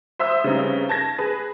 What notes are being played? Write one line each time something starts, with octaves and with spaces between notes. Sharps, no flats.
C5 E5 D#6 E6
C#3 G3 B3 C4 D#4
A5 G#6 A#6
G#4 B4